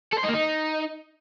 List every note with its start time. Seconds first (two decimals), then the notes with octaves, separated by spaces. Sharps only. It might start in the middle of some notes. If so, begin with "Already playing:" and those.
0.13 A4
0.18 C5
0.24 D#4
0.29 A#3
0.34 D#4